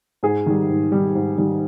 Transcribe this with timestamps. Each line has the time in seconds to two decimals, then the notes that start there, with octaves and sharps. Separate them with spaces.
0.23 G#2 G#4
0.46 D#3 G3
0.69 G#2
0.92 D#3 G3
1.15 G#2
1.38 D#3 G3